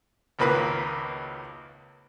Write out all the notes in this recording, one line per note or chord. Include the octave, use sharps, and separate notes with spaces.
G#1 C#2 A#3 B4